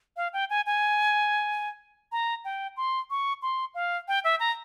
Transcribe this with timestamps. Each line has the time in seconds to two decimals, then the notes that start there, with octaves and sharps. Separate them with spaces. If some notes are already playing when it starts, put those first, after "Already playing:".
0.17 F5
0.33 G5
0.50 G#5
0.66 G#5
2.12 A#5
2.45 G5
2.77 C6
3.10 C#6
3.42 C6
3.75 F5
4.08 G5
4.24 E5
4.40 A#5